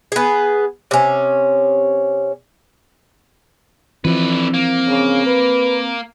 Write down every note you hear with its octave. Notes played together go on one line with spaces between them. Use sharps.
B3 G#4
C3 C#4
D3 E3 F3 C4 B4
A#3
C#3
B4